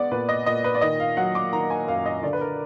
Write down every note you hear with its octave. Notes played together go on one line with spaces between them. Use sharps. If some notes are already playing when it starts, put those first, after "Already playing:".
Already playing: G#3 B3 D5 F#5
A#2 B4
D#5
A#2 D#5
B4
D5
D#3 D#5
F5
F#3 F#5
D6
D#3 A#5
G#5
F#2 F5
D#5
D3 D5
B4
A#4